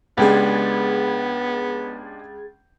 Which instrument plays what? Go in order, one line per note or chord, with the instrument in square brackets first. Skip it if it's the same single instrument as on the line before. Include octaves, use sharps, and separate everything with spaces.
[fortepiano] C#2 [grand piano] G#3 D4 G4 [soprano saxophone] B3 [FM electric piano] G#4 G#6 A6